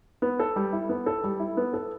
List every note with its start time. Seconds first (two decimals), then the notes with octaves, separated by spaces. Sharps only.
0.22 B3
0.39 A4
0.56 G3
0.72 E4
0.89 B3
1.06 A4
1.24 G3
1.39 E4
1.57 B3
1.73 A4